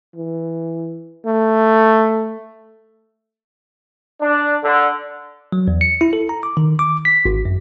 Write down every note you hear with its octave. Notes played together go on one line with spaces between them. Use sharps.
E3
A3
D4
D3
F#3
E2
C#7
E4
A4
A#5
D6
D#3
D6
B6
G#1
F#2